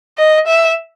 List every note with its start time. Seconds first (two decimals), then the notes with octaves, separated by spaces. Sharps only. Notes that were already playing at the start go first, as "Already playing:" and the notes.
0.18 D#5
0.47 E5